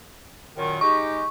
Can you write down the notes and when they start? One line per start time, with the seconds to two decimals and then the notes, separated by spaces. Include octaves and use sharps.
0.56 F#2 A#2 D#3
0.81 G#3 D#4 G4 C#6